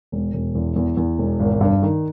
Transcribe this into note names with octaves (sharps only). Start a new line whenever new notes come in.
E1
E1
E2
E2
E2
E1
G#1
G2
D#3